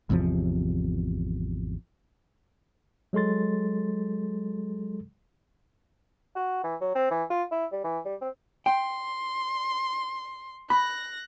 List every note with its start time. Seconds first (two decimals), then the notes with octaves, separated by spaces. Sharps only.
0.10 G#1 E2 C3 F3
3.13 F#3 G#3 A4 C6 A6
6.35 F#4
6.63 E3
6.81 F#3
6.95 C4
7.11 E3
7.30 F4
7.51 E4
7.72 G3
7.84 E3
8.05 G3
8.21 C4
8.66 G5 C6
10.70 B5 F#6 A#6